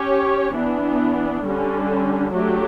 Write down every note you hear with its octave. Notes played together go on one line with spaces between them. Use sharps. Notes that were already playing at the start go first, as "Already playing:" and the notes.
Already playing: C#4 G4 C#5
E3 B3 D4
D3 G3 C#4
F#3 A3 D4 G4